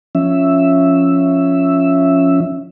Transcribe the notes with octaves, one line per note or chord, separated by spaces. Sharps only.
F3 C#4 E5